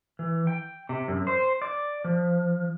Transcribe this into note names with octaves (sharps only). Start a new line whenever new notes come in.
E3
G5
C3
F#2
C5
D5
F3